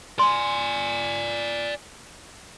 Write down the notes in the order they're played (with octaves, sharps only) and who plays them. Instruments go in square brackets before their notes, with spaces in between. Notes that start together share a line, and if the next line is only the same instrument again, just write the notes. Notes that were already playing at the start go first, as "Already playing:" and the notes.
[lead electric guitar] D5 G#5 [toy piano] C6